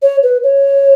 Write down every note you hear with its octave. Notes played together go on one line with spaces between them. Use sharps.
C#5
B4
C#5